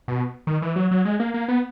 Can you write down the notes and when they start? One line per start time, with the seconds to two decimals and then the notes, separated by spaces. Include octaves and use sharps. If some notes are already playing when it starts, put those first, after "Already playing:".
0.08 B2
0.47 D#3
0.62 E3
0.76 F#3
0.91 F#3
1.05 G#3
1.20 A#3
1.34 A#3
1.48 B3